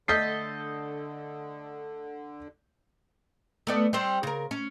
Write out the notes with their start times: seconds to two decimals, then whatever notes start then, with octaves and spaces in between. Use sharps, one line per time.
0.08 D3 A3 A4 D#5 G6 A6 B6 C7
3.67 A3 B3 D5
3.93 G3 C4 C5
4.23 C#3 A#4
4.51 C#4